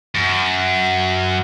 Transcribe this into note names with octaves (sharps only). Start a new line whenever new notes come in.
F#2